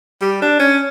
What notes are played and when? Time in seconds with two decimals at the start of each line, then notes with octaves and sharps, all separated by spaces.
0.22 G3
0.42 D4
0.59 C#4